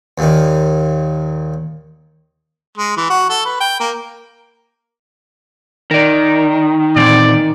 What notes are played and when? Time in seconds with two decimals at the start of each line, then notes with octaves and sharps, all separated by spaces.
0.18 D#2 A#2 D#3
2.78 G#3
2.97 E3
3.10 F#4
3.30 A4
3.45 B4
3.60 G5
3.80 A#3
5.91 D#3 A#4 D5
6.96 A#2 E3 C4 D5